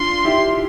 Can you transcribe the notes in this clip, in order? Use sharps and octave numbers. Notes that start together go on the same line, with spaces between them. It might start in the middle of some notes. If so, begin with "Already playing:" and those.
Already playing: D4 F4 C6
E4 G4